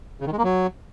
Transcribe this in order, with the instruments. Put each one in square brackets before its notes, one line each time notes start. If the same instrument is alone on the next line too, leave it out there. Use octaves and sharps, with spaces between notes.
[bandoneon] C#3
D#3
G#3
A#3
F#3